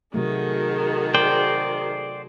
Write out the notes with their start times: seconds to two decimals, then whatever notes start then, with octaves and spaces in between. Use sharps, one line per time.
0.14 C3 D#3 F#3 A3 F#4 G#4 A4
1.14 C5 D5 G5